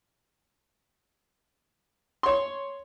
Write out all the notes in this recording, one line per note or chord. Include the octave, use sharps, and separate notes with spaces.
C#5 C6